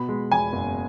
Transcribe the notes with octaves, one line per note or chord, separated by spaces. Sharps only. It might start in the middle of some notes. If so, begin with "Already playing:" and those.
Already playing: B2 B5
G#3
E2 G#5
F#1